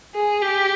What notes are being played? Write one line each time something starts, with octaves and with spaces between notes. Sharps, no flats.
G#4
G4